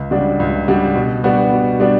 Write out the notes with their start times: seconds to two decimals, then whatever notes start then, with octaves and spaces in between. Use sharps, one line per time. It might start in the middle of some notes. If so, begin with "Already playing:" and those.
Already playing: C#2
0.11 C#3 G3 D4 F#4
0.40 C#2
0.68 C#3 G3 D4 F#4
0.95 B2
1.24 G3 B3 D4 F#4
1.52 B2
1.80 G3 B3 D4 F#4